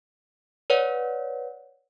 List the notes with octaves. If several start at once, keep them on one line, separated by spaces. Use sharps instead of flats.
B4 C#5 D5 F#5